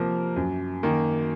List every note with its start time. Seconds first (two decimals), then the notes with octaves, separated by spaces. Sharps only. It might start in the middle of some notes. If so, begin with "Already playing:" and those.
Already playing: C3 F3 A#3 A#4
0.36 F#2
0.83 D#3 A#3